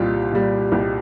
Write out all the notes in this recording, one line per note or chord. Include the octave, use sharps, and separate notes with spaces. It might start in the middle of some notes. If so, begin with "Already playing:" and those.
Already playing: C2 A#2 G3 F4 G4
A#2 G3
C2 G4